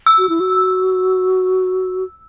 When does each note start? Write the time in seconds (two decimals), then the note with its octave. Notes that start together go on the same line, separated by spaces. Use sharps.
0.06 E6
0.18 F#4
0.29 E4
0.40 F#4